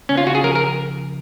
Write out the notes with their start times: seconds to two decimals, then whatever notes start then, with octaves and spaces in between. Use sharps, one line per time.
0.09 C#3 C#4
0.18 F4
0.27 C#3 F#4
0.35 G#4
0.43 F3 A#4
0.55 A#4